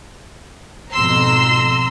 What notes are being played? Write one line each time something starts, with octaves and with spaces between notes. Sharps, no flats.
F2 G#2 B2 A#5 C6 E6